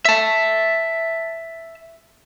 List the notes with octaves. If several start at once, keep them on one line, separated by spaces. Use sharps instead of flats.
E5 A5